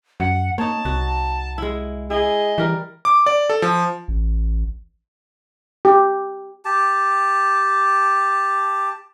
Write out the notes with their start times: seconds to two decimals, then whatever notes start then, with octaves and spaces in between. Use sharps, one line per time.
0.20 F#2 F#5
0.58 A#3 D#4 C#5 A5
0.85 C2 F#4
1.58 G#3 E4
2.10 E4 G#4 D#5
2.58 E3 G3 A#4
3.05 D6
3.26 D5
3.50 A4
3.62 F3
4.08 A1
5.85 G4
6.65 G4 A5